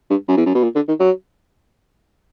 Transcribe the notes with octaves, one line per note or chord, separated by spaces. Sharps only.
G2
F#2
E2
F#2
B2
A#2
D3
D#3
F#3